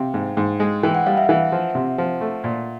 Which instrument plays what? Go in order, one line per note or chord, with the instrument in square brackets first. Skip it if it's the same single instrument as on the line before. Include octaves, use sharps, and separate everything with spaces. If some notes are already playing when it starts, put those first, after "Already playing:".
Already playing: [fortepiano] C3 [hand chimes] F5 G5
[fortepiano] G#2
G#2
G#3
[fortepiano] E3 [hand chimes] G5
[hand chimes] F#5
[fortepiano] G3 [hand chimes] F5
[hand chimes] E5 F#5
[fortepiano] E3
F3
C3
F3
A3
A#2